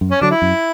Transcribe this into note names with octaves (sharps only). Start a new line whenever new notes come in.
F#2
C#4
D3 F#3 D4
E4
F#2